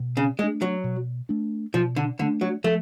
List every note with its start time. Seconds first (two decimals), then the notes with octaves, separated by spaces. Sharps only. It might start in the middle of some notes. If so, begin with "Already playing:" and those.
Already playing: B2
0.17 C#3
0.39 G#3 A3 D4
0.62 F#3
0.84 B2
1.29 A3 D4
1.74 B2 F3
1.96 D3
2.19 D3 A3 D4
2.41 F#3
2.64 F3 A3